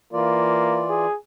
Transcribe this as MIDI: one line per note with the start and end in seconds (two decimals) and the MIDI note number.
0.13 1.06 52
0.13 0.83 58
0.13 1.06 65
0.13 1.06 74
0.89 1.15 68